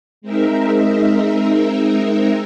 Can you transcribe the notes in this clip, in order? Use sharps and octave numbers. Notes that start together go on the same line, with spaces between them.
G#3 C4 D#4 A#4 E5